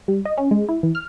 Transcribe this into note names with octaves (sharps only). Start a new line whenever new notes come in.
G3
D#5
C#4
G#3
E4
E3
F6